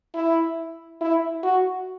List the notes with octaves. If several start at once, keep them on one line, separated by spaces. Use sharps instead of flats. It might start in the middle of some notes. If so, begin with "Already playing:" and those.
E4
E4
F#4